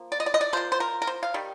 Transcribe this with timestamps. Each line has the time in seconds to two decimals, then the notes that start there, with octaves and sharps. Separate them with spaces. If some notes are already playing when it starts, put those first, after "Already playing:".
Already playing: F3 A#3
0.12 D5
0.20 D#5
0.26 D5
0.34 D#5
0.41 D5
0.53 F3 A#3 C5
0.72 C5
0.80 A#4
1.02 A#4
1.07 C5
1.23 F5
1.34 D#3 G3